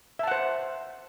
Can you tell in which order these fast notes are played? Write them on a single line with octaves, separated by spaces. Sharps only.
E5 A5 F#5 C5